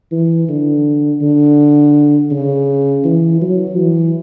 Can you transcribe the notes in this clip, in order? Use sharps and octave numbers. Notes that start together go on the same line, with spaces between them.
E3
D3
D3
C#3
E3
F#3
E3